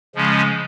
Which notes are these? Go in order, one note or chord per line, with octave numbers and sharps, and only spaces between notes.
C#3 F3 G#3 C#4